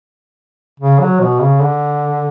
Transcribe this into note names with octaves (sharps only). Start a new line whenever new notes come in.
C#3
F#3
B2
C#3
D3